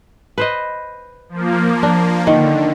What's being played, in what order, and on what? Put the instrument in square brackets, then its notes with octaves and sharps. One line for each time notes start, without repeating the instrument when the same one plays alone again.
[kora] B4 C5 D#5
[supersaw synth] F3 A#3
[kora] D4
[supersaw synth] D3 [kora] D#3